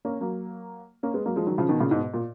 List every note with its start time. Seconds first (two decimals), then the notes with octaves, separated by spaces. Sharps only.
0.05 A#3 C#4
0.21 F#3 A#3
1.03 A#3 C#4
1.14 G#3 B3
1.26 F#3 A#3
1.36 F3 G#3
1.47 D#3 F#3
1.58 C#3 F3
1.69 B2 D#3
1.80 A#2 C#3
1.91 G#2 B2
2.14 A#2